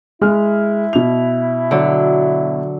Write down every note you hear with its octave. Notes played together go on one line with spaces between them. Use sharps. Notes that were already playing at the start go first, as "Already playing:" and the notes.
G#3 E4 F6
B2 F7
D3 F#3